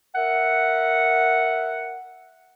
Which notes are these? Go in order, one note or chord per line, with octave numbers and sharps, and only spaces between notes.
A#4 E5 F#5